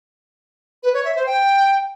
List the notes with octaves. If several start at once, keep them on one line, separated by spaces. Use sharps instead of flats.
B4
C#5
E5
C5
G5